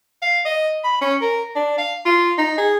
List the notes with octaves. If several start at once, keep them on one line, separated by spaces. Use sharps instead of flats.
F5
D#5
B5
C#4
A#4
D4
F5
F4
D#4
G#4